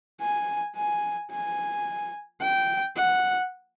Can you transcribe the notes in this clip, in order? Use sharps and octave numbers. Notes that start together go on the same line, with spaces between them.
G#5
G#5
G#5
G5
F#5